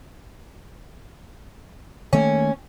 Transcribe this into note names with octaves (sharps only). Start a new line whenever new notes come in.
D#3 A3 A#3 C#4